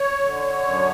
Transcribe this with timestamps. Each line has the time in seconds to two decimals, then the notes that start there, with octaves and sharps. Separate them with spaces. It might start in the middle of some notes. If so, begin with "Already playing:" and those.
Already playing: C#5
0.24 D3
0.67 F#2